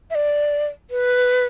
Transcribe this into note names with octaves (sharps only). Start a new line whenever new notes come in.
E5
D5
B4